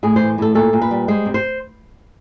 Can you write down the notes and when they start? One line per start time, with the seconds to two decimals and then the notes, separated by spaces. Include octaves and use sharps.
0.03 A2 G#4
0.16 E3 C5
0.38 A2 A4
0.55 A#2 A4
0.73 A#2
0.81 B4
0.91 G3
1.08 G#3 C5
1.26 C3
1.34 C5